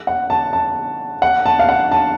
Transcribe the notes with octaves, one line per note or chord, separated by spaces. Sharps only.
F#5
A5
A5
F#5
A5
F5
F#5
A5